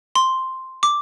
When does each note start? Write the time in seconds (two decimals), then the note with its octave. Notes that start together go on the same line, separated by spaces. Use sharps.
0.15 C6
0.83 D6